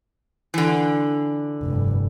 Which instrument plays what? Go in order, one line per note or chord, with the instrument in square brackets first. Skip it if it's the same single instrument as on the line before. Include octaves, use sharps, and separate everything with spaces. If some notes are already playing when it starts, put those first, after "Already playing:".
[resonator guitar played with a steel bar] D3 E3
[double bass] F1 G2